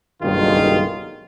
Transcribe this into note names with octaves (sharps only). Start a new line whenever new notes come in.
F#1 B1 G2 D#3 G#3 F4